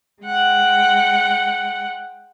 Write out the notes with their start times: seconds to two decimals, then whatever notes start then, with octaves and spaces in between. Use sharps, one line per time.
0.23 G#3 F#5 G5